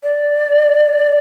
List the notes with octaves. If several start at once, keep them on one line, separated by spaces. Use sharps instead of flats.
D5